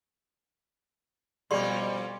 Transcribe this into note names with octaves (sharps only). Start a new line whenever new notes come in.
F2 B2 G3 C#4 G4 D5 C6